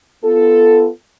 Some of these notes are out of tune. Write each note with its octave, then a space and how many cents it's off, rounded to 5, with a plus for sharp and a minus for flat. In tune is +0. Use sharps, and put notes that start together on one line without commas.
B3 +0 F4 -20 A4 +0